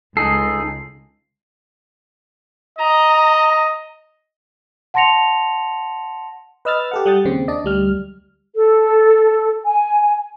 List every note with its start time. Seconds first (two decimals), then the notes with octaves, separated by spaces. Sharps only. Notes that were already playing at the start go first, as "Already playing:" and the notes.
0.17 C#2 D#4 G#4 A4 C7
2.79 D#5 A#5
4.94 F#5 A5 C6 A#6 C#7 F7
6.65 B4 D#5 E6 F6 A6
6.91 G4 A4 F#5
7.06 G3 F#5 D#6 G6 A6
7.25 D#2 C#3 C4
7.48 D4 D5 D#5
7.64 D2 G3 F6
8.55 A4
9.65 G#5